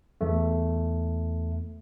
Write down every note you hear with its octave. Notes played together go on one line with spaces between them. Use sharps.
E2 A3